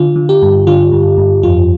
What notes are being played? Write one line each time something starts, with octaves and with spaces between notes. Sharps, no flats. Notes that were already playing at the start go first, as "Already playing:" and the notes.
Already playing: D3 F4
D3
G4
G2
D3 F4
G2
G2
F2 F4